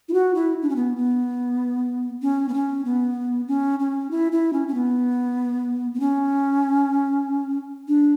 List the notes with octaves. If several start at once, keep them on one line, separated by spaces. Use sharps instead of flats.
E4
F#4
E4
D4
C#4
B3
B3
C#4
B3
C#4
B3
C#4
C#4
E4
E4
C#4
C#4
B3
B3
C#4
D4